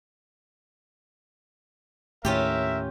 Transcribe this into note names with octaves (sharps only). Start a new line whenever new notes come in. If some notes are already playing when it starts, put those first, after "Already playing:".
D#2 A2 C#4 F4 G4 A#4 E5